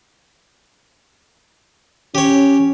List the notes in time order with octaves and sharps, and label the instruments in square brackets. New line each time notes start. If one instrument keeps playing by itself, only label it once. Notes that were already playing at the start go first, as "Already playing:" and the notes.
[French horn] C#4 [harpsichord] G4 C#5